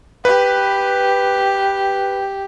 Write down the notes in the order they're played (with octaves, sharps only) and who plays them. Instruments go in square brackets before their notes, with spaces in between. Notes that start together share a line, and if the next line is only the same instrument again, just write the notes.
[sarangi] G4 [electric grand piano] B4